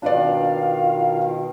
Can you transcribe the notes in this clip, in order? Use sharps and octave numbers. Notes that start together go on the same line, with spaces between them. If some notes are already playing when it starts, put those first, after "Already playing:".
B2 D#3 D4 F4 B4 D5 F5